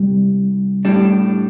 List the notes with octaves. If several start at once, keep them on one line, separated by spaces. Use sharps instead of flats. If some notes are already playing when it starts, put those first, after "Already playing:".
Already playing: C2 G3
A2 G3 D4